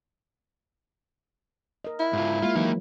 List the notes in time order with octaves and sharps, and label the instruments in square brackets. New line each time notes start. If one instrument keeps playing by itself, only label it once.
[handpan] A#4 D#5
[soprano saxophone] E4
[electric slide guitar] G#2 F4
[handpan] G#3 A#3 [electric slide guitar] F4
[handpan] E3 F#3 [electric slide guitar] A#3 D#4